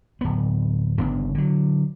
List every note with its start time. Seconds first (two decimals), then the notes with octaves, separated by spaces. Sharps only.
0.21 D1 B3
0.98 G1 C#3 B3 D4
1.35 D3 F#3